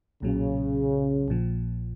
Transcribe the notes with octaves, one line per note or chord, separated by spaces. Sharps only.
B1 A#2 C#3 F#3
A#1 A#2 F3